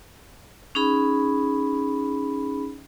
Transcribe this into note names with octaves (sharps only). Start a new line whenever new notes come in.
C#4 D#4 G#4 B5